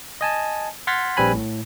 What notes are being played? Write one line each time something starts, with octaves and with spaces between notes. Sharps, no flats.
D#5 G#5 A5
F#5 C6 F6 G#6 A6 B6
A#1 G3 C4 B4 G#5 B5
A2